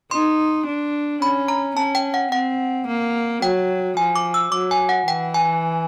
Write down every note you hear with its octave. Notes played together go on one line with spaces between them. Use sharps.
D#4 C6
D4
C#4 B5
A#5
C#4 A5
G5
F#5
C4 F#5
A#3
F#3 G5
F3 G#5
D6
E6
F#3 D6
G#5
F#5
E3 G5
G#5